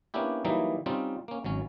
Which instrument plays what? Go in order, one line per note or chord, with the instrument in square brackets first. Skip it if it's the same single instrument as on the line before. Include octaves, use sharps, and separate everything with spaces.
[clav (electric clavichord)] A#3 B3 C#4 D4 E4 G4
E3 F#3 G3 A#3 D#4 E4
G3 C4 C#4 D#4 F4
A#3 C#4
G#1 F#3 C#4